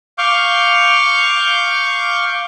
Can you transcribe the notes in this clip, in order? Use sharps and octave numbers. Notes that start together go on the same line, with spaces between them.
F5 C#6 D6 F6 G6